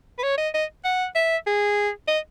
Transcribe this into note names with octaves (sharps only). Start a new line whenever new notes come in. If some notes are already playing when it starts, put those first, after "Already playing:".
B4
C#5
D#5
D#5
F#5
E5
G#4
D#5